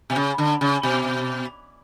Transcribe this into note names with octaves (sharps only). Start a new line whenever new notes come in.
B2
C#3
D3
C#3
B2